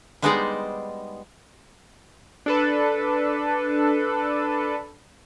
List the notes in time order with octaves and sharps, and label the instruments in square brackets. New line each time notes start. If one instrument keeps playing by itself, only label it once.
[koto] G3 G#3 B3 D#4 C5 D5
[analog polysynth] D4 A4 B4